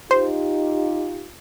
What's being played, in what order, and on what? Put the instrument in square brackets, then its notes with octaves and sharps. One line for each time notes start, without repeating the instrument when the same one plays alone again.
[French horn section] D#4 F4 G4 [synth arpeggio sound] C5